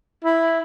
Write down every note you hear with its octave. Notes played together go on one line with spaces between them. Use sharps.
E4